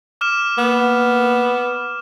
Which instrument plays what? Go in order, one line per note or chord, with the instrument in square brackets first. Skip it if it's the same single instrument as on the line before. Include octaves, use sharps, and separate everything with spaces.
[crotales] D6 F6 E7
[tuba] A#3 [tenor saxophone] B3